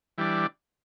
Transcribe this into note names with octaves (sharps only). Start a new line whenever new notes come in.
E3 G3 D4